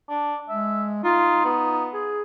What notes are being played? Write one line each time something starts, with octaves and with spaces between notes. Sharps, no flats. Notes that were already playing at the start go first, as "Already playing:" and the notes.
D4
G#3 E5
D#4 F4
B3
G#4